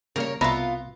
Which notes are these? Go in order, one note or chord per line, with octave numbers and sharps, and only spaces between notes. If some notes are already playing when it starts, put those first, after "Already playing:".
C#3 G3 A#3 A#4 C#5
C2 B2 B3 F4 E5 A#5 B5